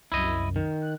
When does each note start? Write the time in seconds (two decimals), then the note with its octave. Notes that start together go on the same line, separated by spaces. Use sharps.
0.12 C2 F#2 E4 D#5
0.56 D#3
0.82 F#6